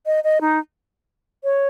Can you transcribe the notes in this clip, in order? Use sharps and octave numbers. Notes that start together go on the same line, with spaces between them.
D#5
D#5
D#4
C#5